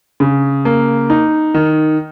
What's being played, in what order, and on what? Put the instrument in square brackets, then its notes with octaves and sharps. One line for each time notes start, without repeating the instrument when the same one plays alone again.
[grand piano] C#3
A#3
D#4
D#3